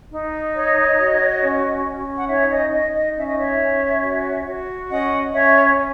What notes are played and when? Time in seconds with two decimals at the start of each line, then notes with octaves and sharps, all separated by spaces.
0.12 D#4
0.55 C#5 D#5
0.99 F#4
1.42 C#4
1.85 C#4
2.17 F#5
2.28 D#4 C#5 E5
2.50 D#5
2.72 D#4 D#5
2.94 D#5
3.15 C#4 E5
3.28 D#5
3.38 C#5 E5
3.60 C#4
4.03 F#4
4.46 F#4
4.89 C#4 D#5 F#5
5.33 C#4 C#5 E5
5.77 C#4